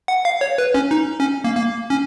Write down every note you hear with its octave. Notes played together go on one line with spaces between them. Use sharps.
F#5
F5
C#5
B4
C#4
D#4
C#4
A#3
A#3
C#4